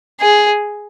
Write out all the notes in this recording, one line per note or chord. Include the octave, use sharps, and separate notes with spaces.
G#4